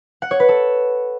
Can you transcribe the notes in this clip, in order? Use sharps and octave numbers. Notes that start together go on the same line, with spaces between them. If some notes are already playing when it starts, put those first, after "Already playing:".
F#5
C#5
B4
A4